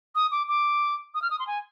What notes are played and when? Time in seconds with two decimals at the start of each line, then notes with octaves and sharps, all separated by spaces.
0.15 D#6
0.31 D6
0.48 D6
1.14 D#6
1.22 F6
1.31 D#6
1.39 C6
1.47 G#5